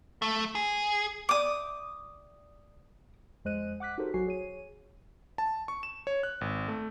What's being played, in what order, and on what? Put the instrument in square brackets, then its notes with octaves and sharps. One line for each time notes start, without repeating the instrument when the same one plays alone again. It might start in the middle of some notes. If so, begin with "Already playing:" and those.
[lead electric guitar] A3
G#4
[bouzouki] D5 E5 G5 [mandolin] D6 D#6
[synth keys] F2 G#3 C5 D#5 F#6 D#7
F#5 D6 F#6 B6
D#4 F#4 G4 A4 A#4 C5
A1 F#3 F#4 G#5 C7
G#4 C#5 D#7
[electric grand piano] A5
C#6
E7
C#5
F#6
G#1
A3